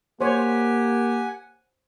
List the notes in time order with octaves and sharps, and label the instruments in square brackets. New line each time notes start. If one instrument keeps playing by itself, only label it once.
[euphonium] A#3 [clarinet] G4 [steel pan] C5 C#5 [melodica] F#5 G#5